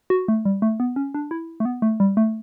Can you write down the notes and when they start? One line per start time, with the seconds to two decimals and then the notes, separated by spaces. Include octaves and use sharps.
0.10 F#4
0.28 A3
0.45 G3
0.62 A3
0.80 B3
0.96 C#4
1.14 D4
1.31 E4
1.60 A3
1.65 B3
1.82 A3
2.00 G3
2.17 A3